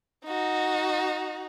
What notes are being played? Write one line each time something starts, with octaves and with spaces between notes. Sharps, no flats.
D#4 F#4